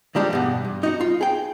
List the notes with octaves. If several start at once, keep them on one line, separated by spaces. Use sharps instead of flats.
D#3 F3 G3 G#3 D4
E2 G2 B2
G2
D#4 F#4 F#5
F4
G#4 G5